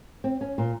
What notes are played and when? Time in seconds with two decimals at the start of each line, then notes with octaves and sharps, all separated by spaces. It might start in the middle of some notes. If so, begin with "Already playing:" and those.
0.24 C4
0.41 C#4
0.58 A#2